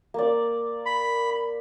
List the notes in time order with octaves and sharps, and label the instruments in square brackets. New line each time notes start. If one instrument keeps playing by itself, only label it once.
[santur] A#3 D5
[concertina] B5